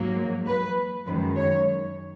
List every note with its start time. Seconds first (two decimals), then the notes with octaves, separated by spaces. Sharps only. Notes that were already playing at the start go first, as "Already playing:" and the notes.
Already playing: G#2 F#3 A#3
0.46 B4
1.06 F#2 D#3 G#3 B4
1.37 C#5